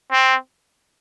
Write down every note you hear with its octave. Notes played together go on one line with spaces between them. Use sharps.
C4